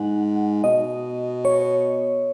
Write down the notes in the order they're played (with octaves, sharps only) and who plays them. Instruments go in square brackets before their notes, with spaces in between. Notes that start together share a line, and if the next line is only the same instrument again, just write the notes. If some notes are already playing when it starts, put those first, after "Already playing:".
Already playing: [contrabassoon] G#2 [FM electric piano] F#5 G#5
[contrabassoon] B2 [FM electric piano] D#5
[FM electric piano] C#5